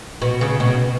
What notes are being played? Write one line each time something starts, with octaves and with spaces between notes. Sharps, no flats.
B2
C#3
B2